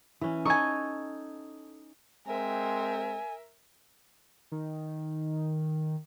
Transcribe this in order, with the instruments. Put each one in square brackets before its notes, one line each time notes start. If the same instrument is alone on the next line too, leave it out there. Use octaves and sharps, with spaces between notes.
[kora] E3 C#4
[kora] D#4 A4 D#5 [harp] G#5 C#6
[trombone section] G#3 C4 [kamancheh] A#4 E5 [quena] G#5
[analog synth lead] D#3